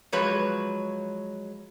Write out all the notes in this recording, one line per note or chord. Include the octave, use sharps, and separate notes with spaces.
F3 F#3 G#3 B4 C#5